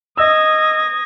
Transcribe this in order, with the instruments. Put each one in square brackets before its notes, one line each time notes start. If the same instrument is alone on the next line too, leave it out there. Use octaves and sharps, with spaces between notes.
[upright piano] D#5 E6 [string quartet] D#6 G#6 A#6